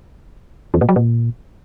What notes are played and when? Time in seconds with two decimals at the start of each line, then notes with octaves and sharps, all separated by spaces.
0.74 E2
0.81 A#2
0.89 F#3
0.96 A#2